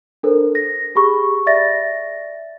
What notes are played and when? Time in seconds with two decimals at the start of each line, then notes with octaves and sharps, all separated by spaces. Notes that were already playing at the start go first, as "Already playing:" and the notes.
0.23 D4 A4 A#4 C5
0.55 A#6
0.95 G4 G#4 B5 C#6
1.46 D5 E5 A6 A#6